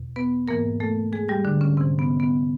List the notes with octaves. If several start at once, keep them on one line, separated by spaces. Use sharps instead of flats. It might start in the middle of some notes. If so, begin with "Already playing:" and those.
Already playing: E2 B2
B3 B4
G#2 E3 A#3 A#4
A3 A4
G#3 G#4
G3 G4
D3 D4
C#3 C#4
G#2 C3 E3 C4
B3
B3